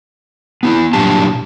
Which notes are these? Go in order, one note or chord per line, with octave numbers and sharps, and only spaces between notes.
B3 D#4 E4
G2 A#2 F#3 D4 G4 A5